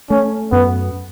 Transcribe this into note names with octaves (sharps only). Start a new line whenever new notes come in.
A3 C#4
F#2 B3